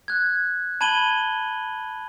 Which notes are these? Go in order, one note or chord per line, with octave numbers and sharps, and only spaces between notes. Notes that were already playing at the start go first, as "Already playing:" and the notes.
F#6 G#6
A5 B5 G#6 D#7 F#7 G7